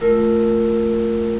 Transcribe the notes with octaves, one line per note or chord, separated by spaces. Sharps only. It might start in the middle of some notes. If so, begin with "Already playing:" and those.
A3 F4 A#4 E6